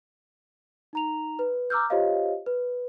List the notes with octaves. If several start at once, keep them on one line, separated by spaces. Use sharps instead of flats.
D#4 A#5 F7
B4
A#5 D6 E6 F6 G6
F4 G4 C5 C#5 D#5 F5
B4